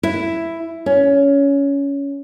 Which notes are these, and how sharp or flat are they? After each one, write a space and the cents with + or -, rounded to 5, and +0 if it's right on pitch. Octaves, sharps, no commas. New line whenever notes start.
E4 +5
C#4 +15